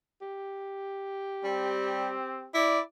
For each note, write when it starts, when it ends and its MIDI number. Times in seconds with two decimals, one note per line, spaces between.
0.21 2.53 67
1.44 2.15 55
1.44 2.48 60
2.54 2.81 64
2.54 2.80 74